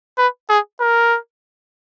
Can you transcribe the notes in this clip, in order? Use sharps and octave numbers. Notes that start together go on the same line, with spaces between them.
B4
G#4
A#4